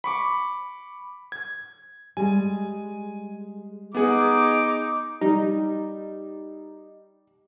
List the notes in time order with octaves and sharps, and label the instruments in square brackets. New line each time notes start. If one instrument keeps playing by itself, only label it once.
[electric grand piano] B5 C#6 D6
G#6
[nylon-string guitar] G3 G#3 [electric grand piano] G#5
[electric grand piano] B3 G#4 F#5 [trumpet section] D#4 D6
[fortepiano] G3 [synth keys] D#4